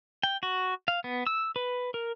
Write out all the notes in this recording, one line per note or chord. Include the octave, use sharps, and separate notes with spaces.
G5
F#4
F5
B3
E6
B4
A#4